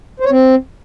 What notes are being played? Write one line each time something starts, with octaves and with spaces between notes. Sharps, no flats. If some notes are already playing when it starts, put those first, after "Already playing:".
C5
C#5
C4